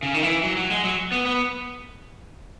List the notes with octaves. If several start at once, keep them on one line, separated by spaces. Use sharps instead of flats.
C#3
D#3
E3
F#3
F#3
G#3
F#3
B3
B3